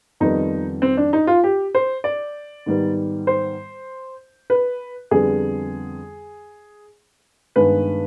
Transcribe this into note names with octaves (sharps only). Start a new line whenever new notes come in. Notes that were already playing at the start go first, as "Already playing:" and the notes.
F2 D#3 G3 B3 D#4
C4
D4
D#4
F4
G4
C5
D5
G#2 D#3 G3 B3
C5
B4
F2 D3 G3 B3 G#4
G2 D#3 G#3 B3 B4